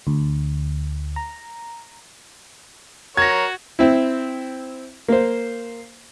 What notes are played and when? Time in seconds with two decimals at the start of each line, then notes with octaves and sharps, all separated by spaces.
0.07 D2
1.16 A#5
3.17 F#4 A#4 C#5 G#6 A#6
3.79 C4 E4
5.08 A#3 C5